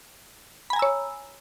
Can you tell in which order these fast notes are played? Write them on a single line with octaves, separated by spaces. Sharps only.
B5 G#5 A#5 E6 C#5